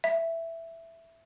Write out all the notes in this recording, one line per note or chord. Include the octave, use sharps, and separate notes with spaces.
E5